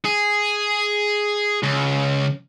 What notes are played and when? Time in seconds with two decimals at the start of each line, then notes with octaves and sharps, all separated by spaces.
0.05 G#4
1.63 C#2